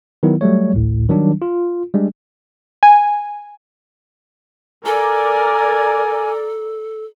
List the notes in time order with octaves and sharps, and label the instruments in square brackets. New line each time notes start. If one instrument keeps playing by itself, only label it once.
[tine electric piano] D#3 F#3 B3 E4
F#3 G3 A3 C#5
A1 D2 A2
D#3 F#3 G3 D4
F4
G3 G#3 D4
[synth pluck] G#5
[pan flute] A4 [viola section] A#4 D5 [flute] G#5